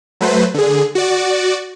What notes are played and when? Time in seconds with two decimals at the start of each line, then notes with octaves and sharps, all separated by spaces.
0.21 F#3 A3 B4 C5
0.54 D3 G#4
0.95 F#4 D5